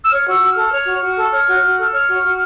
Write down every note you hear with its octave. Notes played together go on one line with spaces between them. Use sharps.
E6
C#5 F6
F#4 E6
F#4
A4 F6
C#5
F#4
F#4
A4
C#5 F6
F#4
F#4
A4
C#5 F6
F#4
F#4